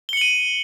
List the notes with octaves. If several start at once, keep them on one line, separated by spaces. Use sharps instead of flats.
C#7 D#7 F#7 G7